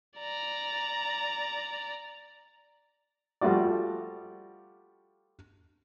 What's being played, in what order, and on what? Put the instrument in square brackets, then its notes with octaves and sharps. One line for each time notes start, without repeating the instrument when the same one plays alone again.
[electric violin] D5 A#5
[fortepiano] F3 G3 A3 F4 F#4 D5